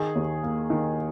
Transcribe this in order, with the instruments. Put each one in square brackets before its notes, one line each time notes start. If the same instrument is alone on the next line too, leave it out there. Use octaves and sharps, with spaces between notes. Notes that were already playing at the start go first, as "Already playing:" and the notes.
Already playing: [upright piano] D#3 G#4
D#2
A#3
D#3